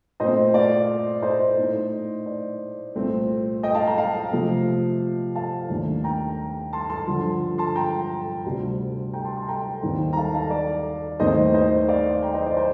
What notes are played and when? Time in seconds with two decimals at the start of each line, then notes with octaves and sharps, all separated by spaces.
0.20 A#2 A3 C4 C5 D#5
0.54 D5 F5
1.22 C5 D#5
1.57 A2 A3 D#4
2.26 D5
2.95 C2 A#2 A3 C4
3.63 D#5 G5
3.74 F5 A5
3.87 G5 A#5
3.98 F5 A5
4.32 C3 F3 A3
5.35 F5 A5
5.70 D#2 D#3 A3 D4
6.04 G5 A#5
6.73 A5 C6
6.90 A5 C6
7.07 G2 D3 F3
7.58 A5 C6
7.75 G5 A#5
8.45 D2 C3 G3
9.13 G5 A#5
9.24 A5 C6
9.36 A5 C6
9.48 G5 A#5
9.82 D#2 D#3 G3 C4 D#4
10.13 A#5
10.17 F5 A5
10.34 F5 A5
10.50 D5
11.20 D#2 D#3 A3 C4 D#4 C5 D#5
11.54 C5 D#5
11.88 D5 F5
12.22 G5 A#5
12.34 C5 D#5
12.46 D5
12.57 C5